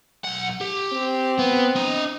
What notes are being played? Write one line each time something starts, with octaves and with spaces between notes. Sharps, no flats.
B1 F#5
G4
C4
B3
D4 D#5